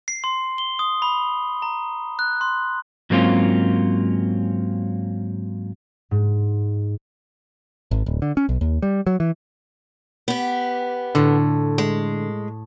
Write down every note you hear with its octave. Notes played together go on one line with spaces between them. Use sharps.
C7
C6
G7
D#6
B5
A#5
F#6
C6
G#2 F#3 A#3 C4 C#4 F4
G#2
G#1
D1
D3
C#4
B1
D#2
G3
F#3
E3
B3 G4
A2 D3
G#3